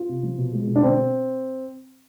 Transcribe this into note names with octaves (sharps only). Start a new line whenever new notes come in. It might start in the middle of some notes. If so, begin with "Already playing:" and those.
Already playing: F4
C3
F3
B2
G#3
B2
D4
D3 C4